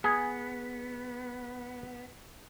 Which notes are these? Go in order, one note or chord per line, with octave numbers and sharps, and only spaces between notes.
B3 G#4